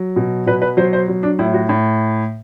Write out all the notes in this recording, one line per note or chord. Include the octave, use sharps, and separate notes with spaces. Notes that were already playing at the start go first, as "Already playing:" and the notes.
Already playing: F#3
B2
B2 B4
B4
F#3 C5
C5
F#3
D4
A2 E4
F#4
A2